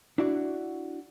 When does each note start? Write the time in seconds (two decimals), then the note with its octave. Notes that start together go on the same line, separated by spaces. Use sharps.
0.18 D4 E4 F#4 D5